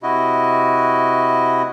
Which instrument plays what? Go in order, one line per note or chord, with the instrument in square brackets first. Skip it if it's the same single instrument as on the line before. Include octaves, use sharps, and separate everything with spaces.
[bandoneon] C3 E4 F#4 D#5